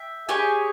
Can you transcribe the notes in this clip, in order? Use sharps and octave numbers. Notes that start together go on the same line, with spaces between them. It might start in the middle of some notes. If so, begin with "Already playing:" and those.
Already playing: E5 G5
G4 G#4 C#5 G#5